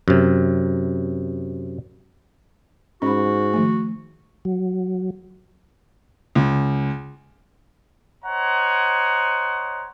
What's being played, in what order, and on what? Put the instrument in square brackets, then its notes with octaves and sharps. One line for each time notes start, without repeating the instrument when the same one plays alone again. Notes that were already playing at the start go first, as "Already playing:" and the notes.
[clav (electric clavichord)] F#2 C3
[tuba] G#2 [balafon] C#4 B5 [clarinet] F#4
[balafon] D#3 F3 A3
[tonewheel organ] F#3
[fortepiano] C#2
[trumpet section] C5 C#5 D#5 F#5 G#5 A#5